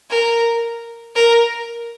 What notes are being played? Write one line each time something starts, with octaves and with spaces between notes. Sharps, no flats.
A#4
A#4